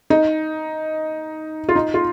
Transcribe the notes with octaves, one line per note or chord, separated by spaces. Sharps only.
D#4
F4
D#4
F4